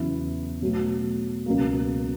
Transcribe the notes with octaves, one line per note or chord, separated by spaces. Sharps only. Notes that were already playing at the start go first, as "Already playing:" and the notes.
Already playing: E2 C#3 F#3 B3 E4
B2 F#3 A3
C#2 B2 F#3 A#3